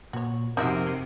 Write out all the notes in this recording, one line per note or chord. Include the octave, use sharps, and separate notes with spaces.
A#2 F#4 C#5
F2 C3 F3 C4 D#4 F#4 A#4 E5